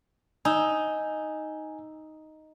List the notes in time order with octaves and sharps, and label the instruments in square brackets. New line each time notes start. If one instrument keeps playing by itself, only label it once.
[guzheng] D#4 [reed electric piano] G#5 E6